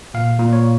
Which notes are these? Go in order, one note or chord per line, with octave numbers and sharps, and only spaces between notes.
A#2 F5
A#2
C#5